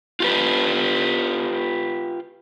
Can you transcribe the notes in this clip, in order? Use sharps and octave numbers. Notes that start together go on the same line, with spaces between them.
F4 G4 B4